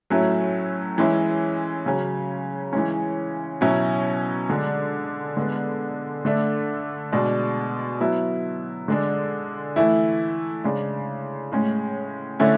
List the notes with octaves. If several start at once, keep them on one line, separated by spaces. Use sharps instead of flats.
A2 F#3 A3 C#4 E4
E3 G#3 C#4 E4
C#3 F#3 C#4
E3 G#3 C#4
B2 F#3 C#4 E4
D3 G#3 D4
D3 G#3 B3
D3 A3 D4
B2 G#3 D4
F#3 B3 E4
D3 G#3 D4
E3 A3 E4
C#3 G#3 D4
A2 G#3 C#4
D3 A3 C#4 E4